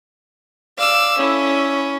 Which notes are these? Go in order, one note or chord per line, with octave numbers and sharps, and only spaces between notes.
D5 F5 E6
C#4 E4 A4